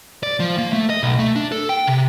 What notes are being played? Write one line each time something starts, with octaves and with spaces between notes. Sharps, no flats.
D5
F3
A#3
A3
D#5
B1
A3
D4
A4
G5
C3